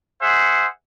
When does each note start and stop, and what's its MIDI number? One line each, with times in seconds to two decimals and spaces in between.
0.21 0.66 68
0.21 0.66 72
0.21 0.66 76
0.21 0.66 78